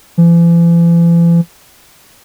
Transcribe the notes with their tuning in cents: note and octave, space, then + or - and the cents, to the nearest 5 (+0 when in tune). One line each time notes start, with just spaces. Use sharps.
E3 +45